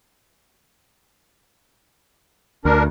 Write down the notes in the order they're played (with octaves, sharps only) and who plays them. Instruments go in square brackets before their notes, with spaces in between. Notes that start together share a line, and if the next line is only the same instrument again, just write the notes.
[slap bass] D2 [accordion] D4 A#4